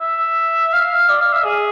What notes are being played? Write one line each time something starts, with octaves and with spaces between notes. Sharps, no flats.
E5
F5
D5
F5
E5
G#4